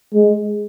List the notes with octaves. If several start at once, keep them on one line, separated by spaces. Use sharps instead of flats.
G#3